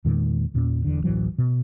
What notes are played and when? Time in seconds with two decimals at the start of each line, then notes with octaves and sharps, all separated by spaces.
0.05 E2 A#2 D#3 G#3
0.54 E2 A#2 C#4
0.84 E1 E2 D3
1.04 D1 A1 E3 F#3
1.38 B2